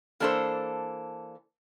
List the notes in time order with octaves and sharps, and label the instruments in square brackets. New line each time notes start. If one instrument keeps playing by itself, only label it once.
[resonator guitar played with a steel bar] E3 A#3 D4 A4 C5